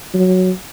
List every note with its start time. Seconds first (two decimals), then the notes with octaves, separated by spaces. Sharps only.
0.14 F#3